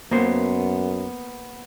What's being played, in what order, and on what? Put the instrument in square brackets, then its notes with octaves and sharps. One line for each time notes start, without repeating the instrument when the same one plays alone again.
[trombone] F#2 [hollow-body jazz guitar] A#3 B3 C5